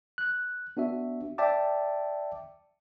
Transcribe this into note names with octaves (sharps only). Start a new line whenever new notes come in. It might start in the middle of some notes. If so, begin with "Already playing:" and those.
F#6
B3 D4 F#4 E5
D5 E5 G5 A5 D6